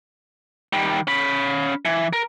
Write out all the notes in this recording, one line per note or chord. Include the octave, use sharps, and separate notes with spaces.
D#3 G3
C#4 B5
E3
A#4